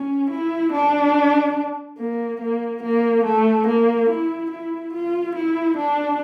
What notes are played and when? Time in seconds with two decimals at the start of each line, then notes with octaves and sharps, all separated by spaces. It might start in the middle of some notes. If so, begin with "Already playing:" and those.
Already playing: C#4
0.31 E4
0.72 D4
1.98 A#3
2.41 A#3
2.83 A#3
3.25 A3
3.67 A#3
4.09 E4
4.51 E4
4.94 F4
5.36 E4
5.77 D4